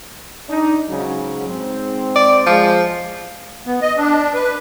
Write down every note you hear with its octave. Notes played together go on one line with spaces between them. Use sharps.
D4 D#4
G#2 C#3 F#3
G#2 C4
D5
F3 G#3
B3
D#5
D4
B4